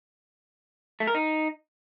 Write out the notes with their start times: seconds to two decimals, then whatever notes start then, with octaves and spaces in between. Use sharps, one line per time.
1.00 A3
1.07 A#4
1.15 D#4